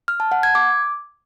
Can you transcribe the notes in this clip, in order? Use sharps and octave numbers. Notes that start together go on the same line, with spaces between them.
F6
A5
F#5
G#6
D6